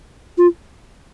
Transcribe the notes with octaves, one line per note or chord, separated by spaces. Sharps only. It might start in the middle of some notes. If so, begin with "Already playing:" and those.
F4